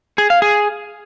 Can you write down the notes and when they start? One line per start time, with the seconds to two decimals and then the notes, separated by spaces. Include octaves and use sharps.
0.18 G#4
0.30 F5
0.42 G#4